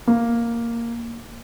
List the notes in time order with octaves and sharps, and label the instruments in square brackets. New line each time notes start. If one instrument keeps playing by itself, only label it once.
[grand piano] A#3